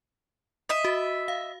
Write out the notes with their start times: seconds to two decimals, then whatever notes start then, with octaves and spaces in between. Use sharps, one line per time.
0.69 D#5 E5
0.85 F#4
1.28 F5